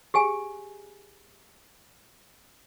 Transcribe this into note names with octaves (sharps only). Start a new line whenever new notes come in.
G4 G#4 G#5